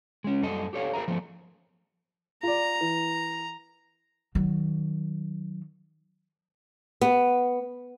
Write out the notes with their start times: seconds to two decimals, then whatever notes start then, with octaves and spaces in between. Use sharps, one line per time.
0.24 G#3 C#4
0.41 F#2 G3 A4 D#5
0.73 G4 A4 C#5 F5
0.93 G#4 A#4 D5 E5 A#5
1.08 F3 A3 B3
2.43 F4 D5 A#5
2.81 E3
4.35 D#3 F#3
7.01 B3